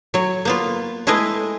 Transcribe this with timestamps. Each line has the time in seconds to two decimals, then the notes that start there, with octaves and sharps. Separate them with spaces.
0.14 F#3 C#5
0.45 A#3 B3 F4
1.07 G#3 A3 E4 G#4 B4 D#5